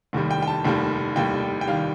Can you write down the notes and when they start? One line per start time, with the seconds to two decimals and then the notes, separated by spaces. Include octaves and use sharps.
0.13 F1 D#2 D#3 G3
0.31 G5
0.42 G5
0.47 A5
0.65 F1 D#2 D#3 G3
1.16 F1 D#2 D#3 G3 G5
1.61 G5
1.67 D#3 G3 F5